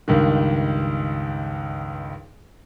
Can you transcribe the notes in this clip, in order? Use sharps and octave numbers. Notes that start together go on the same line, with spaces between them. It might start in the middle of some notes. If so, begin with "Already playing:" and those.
C#2 G2 D#3